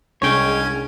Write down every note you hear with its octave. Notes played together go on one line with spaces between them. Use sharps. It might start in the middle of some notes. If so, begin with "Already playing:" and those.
C2 C3 G#3 C#4 D4 C#5 G5 G#6